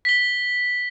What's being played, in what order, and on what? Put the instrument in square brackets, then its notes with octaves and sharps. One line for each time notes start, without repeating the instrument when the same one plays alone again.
[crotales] B6 G7